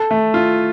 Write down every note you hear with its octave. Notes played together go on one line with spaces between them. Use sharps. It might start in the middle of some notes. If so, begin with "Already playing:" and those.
Already playing: A4
A3
F4